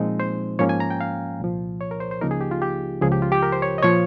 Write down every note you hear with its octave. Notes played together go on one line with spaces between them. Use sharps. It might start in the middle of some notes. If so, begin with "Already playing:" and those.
Already playing: A#2 F3 G#3 C4 D#4
C5
G#2 F3 A#3 C#4 C#5
G#5
A#5
G5
F5
C2 A#2 F3
C#5
A#4
C5
C5
C#2 C#3 F3 A#3 D#4 A#4
G#4
G4
F4
G4
C#2 C#3 F3 G#4
G4
F4
G4
A#4
C5
C#5
D#5
A#2 F3 C#5